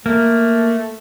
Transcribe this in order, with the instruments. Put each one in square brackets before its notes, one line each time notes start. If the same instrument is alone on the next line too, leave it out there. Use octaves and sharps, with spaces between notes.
[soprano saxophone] A3 [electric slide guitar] A#3